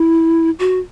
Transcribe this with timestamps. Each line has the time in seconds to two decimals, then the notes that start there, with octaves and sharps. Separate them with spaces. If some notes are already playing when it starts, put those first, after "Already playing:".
Already playing: E4
0.59 F#4